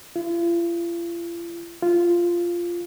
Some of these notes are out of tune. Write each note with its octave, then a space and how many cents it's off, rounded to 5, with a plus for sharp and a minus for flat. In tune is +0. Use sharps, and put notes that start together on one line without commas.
F4 -45
F4 -10